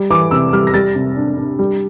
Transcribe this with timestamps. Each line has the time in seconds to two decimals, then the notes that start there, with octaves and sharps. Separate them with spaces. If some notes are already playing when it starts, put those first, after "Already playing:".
Already playing: G3
0.10 E3 D6
0.31 C3 E6
0.53 G3 F6
0.67 A#6
0.74 G3 A6
0.95 C3
1.17 D4
1.37 D4
1.59 G3